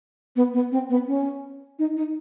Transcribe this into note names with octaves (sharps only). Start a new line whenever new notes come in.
B3
B3
C4
B3
C#4
D#4
D#4